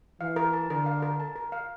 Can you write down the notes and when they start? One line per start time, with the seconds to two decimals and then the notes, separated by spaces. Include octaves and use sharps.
0.20 E3 F5
0.36 A#4
0.53 A5
0.69 D3 A#4
0.86 F5
1.02 A#4
1.20 A5
1.36 A#4
1.52 F5